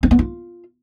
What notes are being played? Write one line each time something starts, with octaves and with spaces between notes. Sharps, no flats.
C4
B3
F4